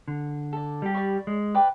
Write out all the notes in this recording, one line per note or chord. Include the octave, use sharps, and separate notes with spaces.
D3
A4 D5
G3 G4
D5 B5 C#6
G#3
B4 D5 G5